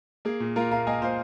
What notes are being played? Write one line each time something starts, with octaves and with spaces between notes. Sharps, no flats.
A#3 G#4
A#2
A#3 F4 A#4
A#2 F5 A#5
A#3 D#5 G#5
A#2 C5 F5